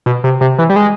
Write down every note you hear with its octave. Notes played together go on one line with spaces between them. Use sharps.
B2
C3
C3
E3
G3
G#3